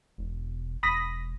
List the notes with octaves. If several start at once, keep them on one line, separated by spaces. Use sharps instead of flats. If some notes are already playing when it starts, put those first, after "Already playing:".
E1
E1 B5 D#6 A#6